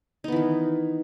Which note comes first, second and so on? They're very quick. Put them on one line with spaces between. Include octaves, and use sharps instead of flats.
D#4 B3 E3 D#3